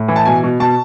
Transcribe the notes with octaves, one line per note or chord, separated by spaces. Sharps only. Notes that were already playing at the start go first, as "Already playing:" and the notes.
Already playing: A2
E3
A5
B2 G#5
B2
B2 A5